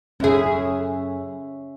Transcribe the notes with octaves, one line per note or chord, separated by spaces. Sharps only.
F#2 C#4 G#4 E5